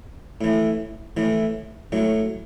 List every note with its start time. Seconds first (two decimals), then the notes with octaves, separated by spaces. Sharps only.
0.41 A2 E3
1.17 A2 E3
1.92 A2 F#3